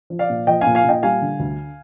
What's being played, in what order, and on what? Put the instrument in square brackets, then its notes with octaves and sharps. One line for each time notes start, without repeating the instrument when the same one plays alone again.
[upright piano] F3
D5 F5
A#2
F3 D#5 G5
F5 G#5
A#2
F5 G#5
A#2 D#5 G5
G3 F5 G#5
D3
D2